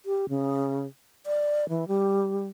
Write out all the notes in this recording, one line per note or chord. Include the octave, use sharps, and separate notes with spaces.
G4
C#3
D5
E3
G3